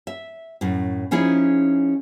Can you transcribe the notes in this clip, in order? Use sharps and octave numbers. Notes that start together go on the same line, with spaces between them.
E5
F#2 A2
F3 C#4 D#4 E4 G#4